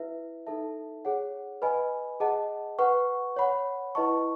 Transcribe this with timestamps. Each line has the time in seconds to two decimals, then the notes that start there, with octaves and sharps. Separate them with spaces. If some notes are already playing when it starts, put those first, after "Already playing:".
Already playing: E4 B4 E5
0.47 D#4 A4 E5 A5
1.05 G#4 C#5 F#5
1.62 B4 D#5 G#5 B5
2.20 G#4 D#5 F#5 A5
2.79 B4 F#5 C#6
3.36 C#5 F#5 B5
3.95 E4 B4 D#5 A5 C#6